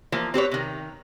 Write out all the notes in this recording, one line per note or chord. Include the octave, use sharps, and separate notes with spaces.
E3 F3 A#3
C4 G4 B4 C#5
C3 D#3